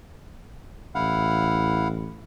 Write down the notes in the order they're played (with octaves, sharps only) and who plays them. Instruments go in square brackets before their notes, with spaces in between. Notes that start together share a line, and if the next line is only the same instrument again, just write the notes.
[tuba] A1 [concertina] E4 F5 F#5